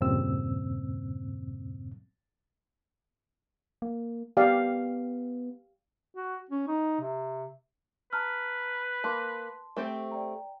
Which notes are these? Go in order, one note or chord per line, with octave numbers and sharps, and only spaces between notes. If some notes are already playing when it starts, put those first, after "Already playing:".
E2 G2 A#2 C#3 C4 E6
A#3
B3 G4 D5 F5
F#4
C#4
D#4
C3
B4 A5 A#5 F6
A#3 A5 C6
A3 C4 G4
D5 G5 A#5